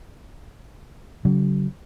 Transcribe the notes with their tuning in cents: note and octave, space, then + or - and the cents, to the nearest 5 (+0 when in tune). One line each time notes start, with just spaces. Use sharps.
D3 -45 F#3 +35